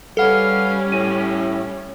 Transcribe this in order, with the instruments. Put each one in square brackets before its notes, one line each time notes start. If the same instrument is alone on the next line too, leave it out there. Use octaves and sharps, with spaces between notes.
[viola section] G3 C#4 [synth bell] A4 F#5 [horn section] B4 F5
[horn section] A2 [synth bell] D#7